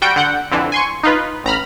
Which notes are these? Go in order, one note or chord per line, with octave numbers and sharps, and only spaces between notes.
G3 F#4 G5 D7
D3 F#5 G6
F2 D3 E3
G#5 C6 C#6
D#4 F4 B4
A1 A#5 B5 F6